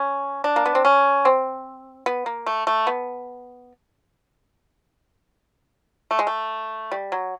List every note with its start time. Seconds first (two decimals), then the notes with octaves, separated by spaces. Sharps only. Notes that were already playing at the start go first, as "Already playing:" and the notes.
Already playing: C#4
0.44 D4
0.56 A#3
0.66 B3
0.75 C4
0.85 C#4
1.25 C4
2.06 B3
2.26 A#3
2.46 A3
2.67 A3
2.87 B3
6.11 A3
6.19 G#3
6.27 A3
6.92 G3
7.12 F#3